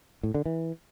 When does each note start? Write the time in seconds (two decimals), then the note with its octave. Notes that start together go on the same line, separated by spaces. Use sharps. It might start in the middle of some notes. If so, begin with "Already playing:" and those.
0.23 A2
0.34 D3
0.46 E3